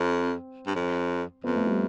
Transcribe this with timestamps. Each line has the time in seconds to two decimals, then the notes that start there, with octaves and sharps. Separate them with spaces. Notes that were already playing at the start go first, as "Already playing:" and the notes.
Already playing: F2 C4
0.67 G2
0.76 F2
1.44 F2 B3
1.55 A3
1.67 G3